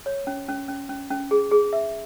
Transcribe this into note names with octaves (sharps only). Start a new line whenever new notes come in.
C#5
C#4
C#4
C#4
C#4
C#4
G#4
G#4
E5